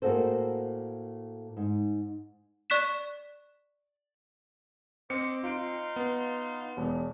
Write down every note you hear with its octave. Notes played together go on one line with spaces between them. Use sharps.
A2 A#3 F#4 G#4 A4 C5
G#2
D5 C#6 F#6 B6 E7
C4 C5 D#5 D6 C#7
D#4 F4 F5 C6 D7
B3
E1 E2 C#5